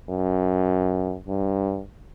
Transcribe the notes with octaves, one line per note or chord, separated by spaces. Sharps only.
F#2
G2